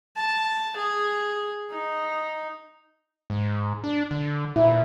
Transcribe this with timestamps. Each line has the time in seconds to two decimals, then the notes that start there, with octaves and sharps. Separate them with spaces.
0.17 A5
0.76 G#4
1.71 D#4
3.30 G#2
3.84 D4
4.11 D3
4.56 A#2 E4